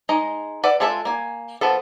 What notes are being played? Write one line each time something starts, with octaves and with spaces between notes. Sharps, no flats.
G#3 D#4 D#5
B4 D5 E5 F#5
G#3 F4 A4 B4 E5
A#3 G#5
F3 B3 A4